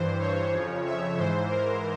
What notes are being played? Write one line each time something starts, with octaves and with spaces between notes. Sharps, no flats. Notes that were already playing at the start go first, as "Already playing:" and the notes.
Already playing: G2 E3 C5
C#5
F2 C#3 F3
E5
G#2 E3 C5
A#4